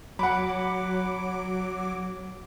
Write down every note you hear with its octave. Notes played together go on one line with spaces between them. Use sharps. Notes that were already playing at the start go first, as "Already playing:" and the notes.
F#3 F#5 B5 D6